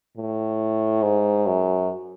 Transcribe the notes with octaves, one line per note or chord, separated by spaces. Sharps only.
A2
G#2
F#2